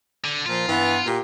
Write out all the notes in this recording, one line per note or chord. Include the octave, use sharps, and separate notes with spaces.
D3
A#2 F3 F4
G2 E3 B3
A#2 G4